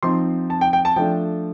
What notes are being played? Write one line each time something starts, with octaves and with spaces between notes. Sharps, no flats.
F3 C4 D#4 C6
A5
G5
G5
A5
F3 A3 D4 G5